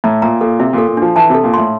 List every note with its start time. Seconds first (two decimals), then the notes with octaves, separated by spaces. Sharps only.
0.04 A2 A#5
0.22 A#2 A#5
0.41 A#2 A4
0.59 C3 E5
0.73 A#2 A4
0.88 A#2
0.97 F3 D4
1.16 E3 A5
1.30 C3 A4
1.44 A#2
1.54 A2 C6